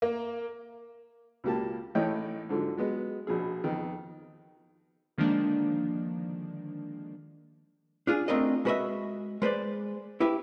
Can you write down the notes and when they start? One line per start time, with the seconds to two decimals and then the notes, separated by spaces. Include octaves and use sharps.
0.02 A#3
1.44 C#2 B2 A#3 G4 A5
1.95 A1 A2 D#4 C#5 D#5 G5
2.49 G#2 D3 F3 F#3
2.77 F#3 G#3 B3
3.27 A#1 B2 G#4
3.64 F2 D#3 B3
5.18 D3 D#3 F3 G#3 A#3 D4
8.07 D4 F4 G#4
8.28 A3 C4 D4 F4 A#4 D#5
8.65 G#3 F#4 B4 C#5 D#5 E5
9.42 G#3 B4 C5 D5
10.20 E4 G4 B4 E5